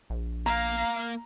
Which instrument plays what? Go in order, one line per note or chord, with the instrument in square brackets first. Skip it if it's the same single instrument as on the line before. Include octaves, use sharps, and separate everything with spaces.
[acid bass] A#1
[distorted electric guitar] A#3 [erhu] F5 [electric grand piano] A#5